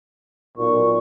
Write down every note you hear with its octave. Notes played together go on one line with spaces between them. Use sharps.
B1 A#2 C#6